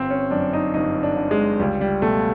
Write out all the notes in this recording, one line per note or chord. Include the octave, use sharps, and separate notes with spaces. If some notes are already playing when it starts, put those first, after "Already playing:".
Already playing: G1 C4
C#4
F#2 D4
D#4
G1 D#4
D4
D3
G#3
C#2 G3
G3
B2 A3